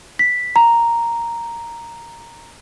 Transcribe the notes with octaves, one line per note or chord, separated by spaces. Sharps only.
B6
A#5